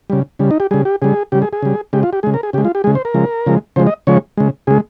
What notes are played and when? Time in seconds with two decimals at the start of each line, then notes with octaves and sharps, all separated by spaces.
0.10 C#3 G3
0.39 C#3 G3
0.51 D#4
0.60 G4
0.71 C#3 G3 G#4
0.85 G4
1.02 C#3 G3 G#4
1.32 C#3 G4
1.35 G3
1.42 G#4
1.53 G#4
1.63 C#3 G3
1.93 C#3 G#3 G4
2.03 F4
2.13 G4
2.23 C#3 G#3 G#4
2.34 A#4
2.43 G#4
2.53 C#3 G4
2.58 G#3
2.65 F4
2.75 G4
2.84 G#3 G#4
2.87 C#3
2.95 C5
3.05 A#4
3.14 C#3 F3 G#3
3.46 C#3 F3 G#3
3.76 C#3 F3 G#3 C5
3.87 D#5
4.07 C#3 F3 G#3 C#5
4.37 C#3 G#3
4.67 C#3 G#3 G#4